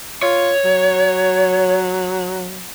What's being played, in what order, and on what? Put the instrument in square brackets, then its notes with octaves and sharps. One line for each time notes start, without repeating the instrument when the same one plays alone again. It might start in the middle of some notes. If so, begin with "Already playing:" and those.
[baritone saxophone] F4 [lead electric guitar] C#5
[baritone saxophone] F#3